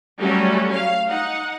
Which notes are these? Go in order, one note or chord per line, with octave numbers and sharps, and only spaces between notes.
F#3 G3 A3 C#4 F#4
F5
D#4 F#5